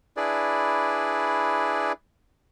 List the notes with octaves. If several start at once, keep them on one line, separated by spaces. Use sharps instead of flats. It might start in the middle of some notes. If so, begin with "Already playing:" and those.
D4 E4 G#4 B4 D5